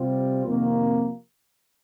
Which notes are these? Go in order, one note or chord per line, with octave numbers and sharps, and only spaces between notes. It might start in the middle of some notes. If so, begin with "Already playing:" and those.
Already playing: C3 G3 C4 F4
F2 C3 D#3 A#3